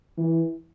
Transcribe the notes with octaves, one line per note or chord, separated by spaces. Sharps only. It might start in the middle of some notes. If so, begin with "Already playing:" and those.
E3